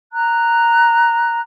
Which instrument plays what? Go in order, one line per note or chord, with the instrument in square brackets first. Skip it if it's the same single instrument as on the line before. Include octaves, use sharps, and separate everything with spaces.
[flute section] A#5 F#6